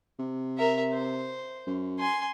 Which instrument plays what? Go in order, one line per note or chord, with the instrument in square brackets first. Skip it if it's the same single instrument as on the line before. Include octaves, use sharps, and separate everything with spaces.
[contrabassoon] C3
[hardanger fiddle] A#4 E5
C5
[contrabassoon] F#2
[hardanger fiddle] G#5 C6